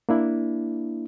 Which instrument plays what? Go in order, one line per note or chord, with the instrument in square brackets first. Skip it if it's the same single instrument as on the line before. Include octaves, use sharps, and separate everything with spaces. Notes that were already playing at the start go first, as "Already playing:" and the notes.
[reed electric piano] A#3 D4 E4